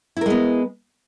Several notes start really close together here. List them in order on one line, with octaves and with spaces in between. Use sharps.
E4 A#4 G#3 B3